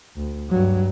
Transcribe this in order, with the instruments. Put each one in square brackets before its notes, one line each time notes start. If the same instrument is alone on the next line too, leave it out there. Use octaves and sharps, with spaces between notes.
[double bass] D2
G2 F#3